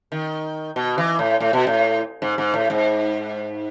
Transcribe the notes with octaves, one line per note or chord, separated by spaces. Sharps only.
D#3
B2
E3
A2
A2
B2
A2
G#2
G#2
A2
G#2